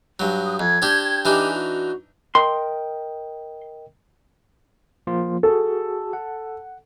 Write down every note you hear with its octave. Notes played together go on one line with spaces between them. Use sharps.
G2 F#3
D#6
F2 G#6
C4 D4 G4
E3 D4 D#4 G4 G#5
F#4
A#4 D#5 G5 C6
F3 A#3 F4
F#4 G#4 A4
F#5